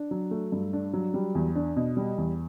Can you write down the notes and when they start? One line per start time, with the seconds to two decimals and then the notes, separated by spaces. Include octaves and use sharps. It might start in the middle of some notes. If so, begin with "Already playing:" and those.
Already playing: D4
0.11 F#3
0.31 A3
0.52 G2
0.73 D4
0.93 F#3
1.14 G3
1.35 E2
1.55 D4
1.76 B2
1.97 G3
2.18 E2